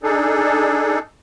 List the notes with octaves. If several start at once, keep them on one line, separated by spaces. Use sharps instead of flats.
D4 D#4 G#4 A4